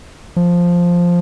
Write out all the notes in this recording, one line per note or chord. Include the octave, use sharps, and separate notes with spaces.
F3